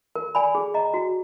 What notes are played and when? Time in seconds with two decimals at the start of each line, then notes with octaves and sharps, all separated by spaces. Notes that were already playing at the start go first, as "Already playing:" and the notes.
0.16 A#4
0.35 D5 G#5 B5
0.55 G#4
0.74 D#5 A#5
0.94 F#4